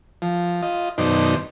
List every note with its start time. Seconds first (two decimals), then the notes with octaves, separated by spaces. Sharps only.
0.22 F3
0.62 F4 D#5
0.98 F#2 B2 D#3 D#4 C5 D5